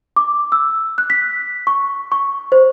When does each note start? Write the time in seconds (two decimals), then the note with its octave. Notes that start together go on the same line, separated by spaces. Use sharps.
0.16 D6
0.52 E6
0.98 F#6
1.10 B6
1.67 C#6
2.12 C#6
2.52 C5